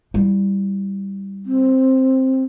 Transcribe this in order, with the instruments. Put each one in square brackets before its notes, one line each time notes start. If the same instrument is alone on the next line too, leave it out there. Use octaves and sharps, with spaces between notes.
[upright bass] G3 E4
[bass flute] C4